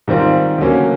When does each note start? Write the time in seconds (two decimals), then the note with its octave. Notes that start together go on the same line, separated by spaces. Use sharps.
0.08 G#2 D#3 G3 C4 F4
0.58 D2 C#3 F#3 A#3 C#4